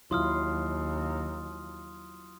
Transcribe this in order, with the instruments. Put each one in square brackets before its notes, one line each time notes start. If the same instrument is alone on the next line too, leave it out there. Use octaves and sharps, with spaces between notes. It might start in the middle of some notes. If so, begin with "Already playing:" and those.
[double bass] D#2 [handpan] F#3 E4 F4 [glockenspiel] C6 D#6 F6